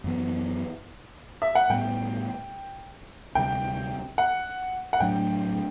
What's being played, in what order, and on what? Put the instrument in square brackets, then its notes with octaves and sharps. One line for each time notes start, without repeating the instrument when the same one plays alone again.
[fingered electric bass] F#2 E3 B3
[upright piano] E5
F#5
[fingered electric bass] A2 G3 B3 [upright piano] G5
[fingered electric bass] D2 C3 G3 [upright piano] G5
[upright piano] F#5
F#5
[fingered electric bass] A2 F#3 A3 D4 [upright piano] G5